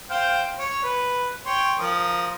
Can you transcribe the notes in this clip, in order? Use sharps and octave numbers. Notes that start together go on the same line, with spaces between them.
C5 F5 G5
C#5
B4
C#5 G5 C6
F3 A#4 D#6